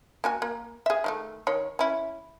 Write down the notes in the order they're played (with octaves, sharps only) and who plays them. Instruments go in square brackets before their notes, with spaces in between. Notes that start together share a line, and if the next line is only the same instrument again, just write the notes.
[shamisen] A#3 F#4 G#5
A#3
G#4 E5
D#3 G#3 A3
D#3 C#5
C#4 E4